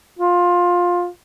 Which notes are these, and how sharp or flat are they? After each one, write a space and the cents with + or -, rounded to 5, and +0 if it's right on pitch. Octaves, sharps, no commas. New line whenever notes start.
F4 +15